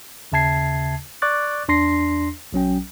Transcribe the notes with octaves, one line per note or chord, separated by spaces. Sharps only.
D#2 C#3 E5 A5 G#6 C7
D5 C#6 D6 F#6 A6
E2 D4 C6 A#6 C7
B1 F#3 C#4 G5